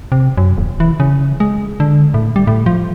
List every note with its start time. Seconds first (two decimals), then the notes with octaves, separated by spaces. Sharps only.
0.12 C3
0.37 F#2
0.58 D#1
0.80 E3
1.00 C#3
1.40 G#3
1.80 D3
2.14 A2
2.36 G3
2.47 A2
2.66 F3